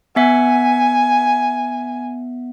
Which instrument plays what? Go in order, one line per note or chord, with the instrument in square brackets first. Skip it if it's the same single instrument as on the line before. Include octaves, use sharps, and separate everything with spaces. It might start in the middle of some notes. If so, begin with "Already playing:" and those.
[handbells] B3 E5 F#5 [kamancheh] G#5